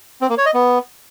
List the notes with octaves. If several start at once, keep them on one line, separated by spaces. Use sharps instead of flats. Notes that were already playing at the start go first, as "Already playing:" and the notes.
C4
A#3
C#5
D#5
B3